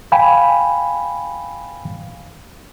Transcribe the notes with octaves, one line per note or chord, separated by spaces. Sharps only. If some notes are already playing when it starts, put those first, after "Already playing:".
F5 G5 G#5 B5